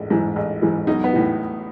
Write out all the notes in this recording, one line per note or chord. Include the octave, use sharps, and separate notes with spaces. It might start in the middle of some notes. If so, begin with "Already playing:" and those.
Already playing: A1 G#2
G#2 E3
A1
G#2 E3
B1 D#4
B3
A2 E3